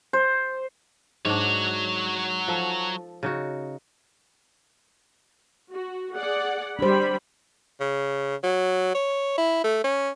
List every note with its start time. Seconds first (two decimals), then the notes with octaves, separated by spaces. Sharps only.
0.13 C5
1.25 G#2 F#3 D4 C#5
2.48 F3 A4
3.23 C#3 D#4 F#4
5.73 F#4
6.16 G#4 D5 F#5
6.79 G3 D4 C5 B5
7.80 C#3
8.44 F#3
8.95 C#5
9.38 E4
9.64 A3
9.84 C#4